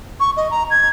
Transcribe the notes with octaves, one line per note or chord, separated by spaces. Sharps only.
C#6
D#5
A#5
G#6